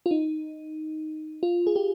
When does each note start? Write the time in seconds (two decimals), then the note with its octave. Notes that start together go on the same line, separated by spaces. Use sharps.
0.06 F4
0.11 D#4
1.43 F4
1.67 G#4
1.76 G4